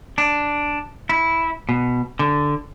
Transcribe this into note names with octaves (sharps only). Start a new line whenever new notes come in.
D4
E4
B2
D3